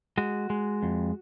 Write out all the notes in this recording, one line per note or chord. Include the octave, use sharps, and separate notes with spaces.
G#3 F#4
G#3
F2